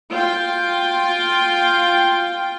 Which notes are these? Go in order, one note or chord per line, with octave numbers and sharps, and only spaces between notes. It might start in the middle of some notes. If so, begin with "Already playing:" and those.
F4 G5